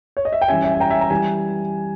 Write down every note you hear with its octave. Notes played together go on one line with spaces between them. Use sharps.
C#5
D#5
E5
G5
E3 G3 C#4 E5 G#5
E5 G#5
G#5
G5 A#5
E5 G#5
A#5
E3 G3 G#5